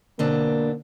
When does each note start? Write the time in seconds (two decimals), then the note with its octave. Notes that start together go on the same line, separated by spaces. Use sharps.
0.19 B2 D3 A#3 C4 D4